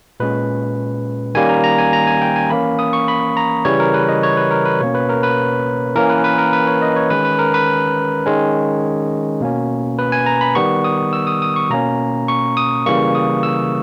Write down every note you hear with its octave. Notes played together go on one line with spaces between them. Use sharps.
A#2 G#3 C#4 B4
D#3 G3 A#3 C#4 G#5
A#5
A#5
G#5
A#5
G#5
G5
G#5
E3 A#3 C#4 B5
D#6
C#6
B5
A#5
C#3 E3 G3 C#5
A#4
B4
D#5
C#5
B4
A#4
B4
B2 A#3 C#4 C#5
B4
A#4
B4
E3 A#3 C#4 A#4
B4
B4
A#4
B4
C#5
D#5
C#5
D#3 G#3 C#4 B4
B4
A#4
B4
D#3 G#3 C#4
B2 A#3 C#4
B4
G#5
A#5
B5
D#3 G3 B3 C#6
D#6
E6
D#6
D#6
C#6
B2 A#3 C#4 A#5
C#6
D#6
C#3 E3 G3 A#3 C#6
D#6
E6